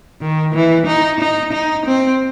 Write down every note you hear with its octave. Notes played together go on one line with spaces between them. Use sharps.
D#3
E3
D#4
D#4
D#4
C4